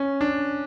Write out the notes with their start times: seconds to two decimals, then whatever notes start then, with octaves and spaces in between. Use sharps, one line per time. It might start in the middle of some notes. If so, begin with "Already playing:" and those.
Already playing: C#4
0.21 D4